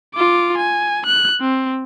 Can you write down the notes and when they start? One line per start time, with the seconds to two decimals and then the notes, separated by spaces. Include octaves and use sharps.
0.15 F4 D6
0.58 G#5
1.06 F#6
1.40 C4